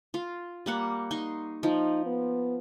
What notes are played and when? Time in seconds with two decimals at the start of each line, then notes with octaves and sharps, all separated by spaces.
0.14 F4
0.66 G3 A#3 F#5
1.11 D#4 C6 C#6
1.63 F3 D#4
2.06 B3